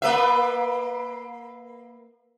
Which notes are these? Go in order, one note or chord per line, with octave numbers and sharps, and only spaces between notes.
A#3 B4 E5